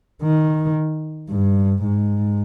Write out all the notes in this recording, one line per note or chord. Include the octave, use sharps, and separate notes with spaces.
D#3
G2
G#2